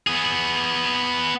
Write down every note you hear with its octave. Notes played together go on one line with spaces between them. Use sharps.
B3 G#4